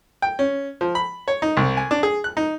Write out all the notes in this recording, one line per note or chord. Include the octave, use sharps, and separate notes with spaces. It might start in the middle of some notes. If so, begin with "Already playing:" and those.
G5
C#4
F3
B5
C#5
D#4
C2
G#5
D4
G#4
F#6
D#4